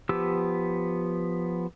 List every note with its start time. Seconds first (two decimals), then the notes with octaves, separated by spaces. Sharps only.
0.09 F3 B3 G4 E6